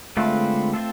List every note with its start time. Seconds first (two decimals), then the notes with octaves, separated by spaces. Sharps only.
0.17 D3 G#3 A3 C4 F4 B4
0.74 C4 F4 A4